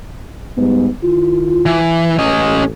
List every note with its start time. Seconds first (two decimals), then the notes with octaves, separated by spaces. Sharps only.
0.57 G#2 G3 B3
1.03 D#3 E4 F4
1.66 E3
2.19 A1 C#4 D#5